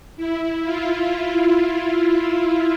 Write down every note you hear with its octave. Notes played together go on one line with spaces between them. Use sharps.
E4
F4